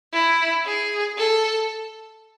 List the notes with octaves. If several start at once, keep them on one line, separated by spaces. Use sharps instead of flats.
E4
G#4
A4